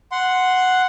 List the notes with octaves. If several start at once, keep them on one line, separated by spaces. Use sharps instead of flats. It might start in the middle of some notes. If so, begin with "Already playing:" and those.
F#5 C6